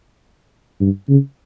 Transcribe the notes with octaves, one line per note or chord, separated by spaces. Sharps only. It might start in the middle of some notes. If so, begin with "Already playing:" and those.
G2
C#3